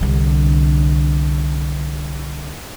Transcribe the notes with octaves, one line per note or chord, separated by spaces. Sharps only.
C2 D3